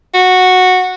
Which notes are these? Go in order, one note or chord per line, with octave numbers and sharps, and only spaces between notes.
F#4